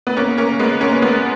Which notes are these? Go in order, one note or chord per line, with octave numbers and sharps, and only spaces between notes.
B3
A#3 C#4
A#3 C#4
G#3 B3
A#3 C#4
G#3 B3